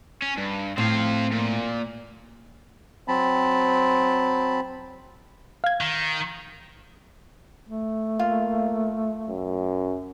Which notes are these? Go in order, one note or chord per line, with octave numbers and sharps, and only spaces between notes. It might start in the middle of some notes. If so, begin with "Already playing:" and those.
C#4
G2
A2 C4 F5
A#2
F#3 C4 A5 B5
F5 G#6
D#3
A3
A#3 F4
F#2